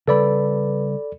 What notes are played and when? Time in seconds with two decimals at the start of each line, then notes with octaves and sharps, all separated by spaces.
0.08 C#3 G3 A4 B4 D5 B5